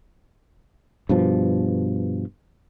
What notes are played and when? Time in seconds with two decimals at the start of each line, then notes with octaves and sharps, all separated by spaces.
1.09 G2 B2 F3